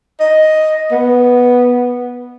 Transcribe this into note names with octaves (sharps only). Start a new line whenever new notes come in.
D#5
B3